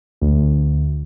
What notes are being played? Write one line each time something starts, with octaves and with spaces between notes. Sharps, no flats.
D2